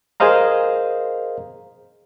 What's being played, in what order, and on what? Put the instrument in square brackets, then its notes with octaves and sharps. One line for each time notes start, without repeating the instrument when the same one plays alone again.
[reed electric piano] G#4 A#4 C5 D#5 F5 A#5